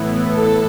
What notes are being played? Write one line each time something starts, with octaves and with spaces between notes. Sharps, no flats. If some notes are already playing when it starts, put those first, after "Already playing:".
Already playing: A2 E3 B3 E4
A4